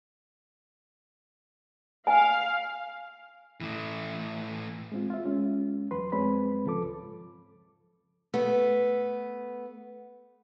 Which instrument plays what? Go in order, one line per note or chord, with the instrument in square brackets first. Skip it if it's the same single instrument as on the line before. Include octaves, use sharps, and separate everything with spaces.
[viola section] F5 [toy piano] G#5
[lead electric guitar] A2 E3
[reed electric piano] G#3 C4 F4
F4 E5
G#3 C#4
E2 F#3 B4 C6
F2 G#3 C4 B4 C#5 B5
C#2 G#2 F3 A4 D6
[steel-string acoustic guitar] A3 B3